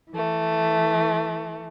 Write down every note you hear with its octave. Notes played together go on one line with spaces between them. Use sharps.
E3 A3